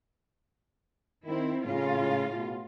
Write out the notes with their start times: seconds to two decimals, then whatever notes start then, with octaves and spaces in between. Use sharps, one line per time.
1.25 D#3 C4 E4
1.66 A2 C#3 F4
2.35 B2